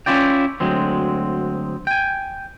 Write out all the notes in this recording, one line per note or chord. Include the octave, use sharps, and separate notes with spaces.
C#4 D4 E4 F4 D5 G5
D2 F#3 G#3 C4
G5 G#5